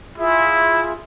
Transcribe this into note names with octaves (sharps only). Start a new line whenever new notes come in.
E4 F4 G#4 E5